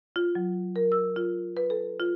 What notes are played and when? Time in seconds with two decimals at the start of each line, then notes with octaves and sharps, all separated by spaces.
0.16 F4
0.35 F#3
0.76 A#4
0.92 E6
1.16 F4
1.57 B4
1.70 A4
2.00 F4